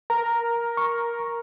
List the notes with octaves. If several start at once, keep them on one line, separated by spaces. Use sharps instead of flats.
A#4 A#5
C#6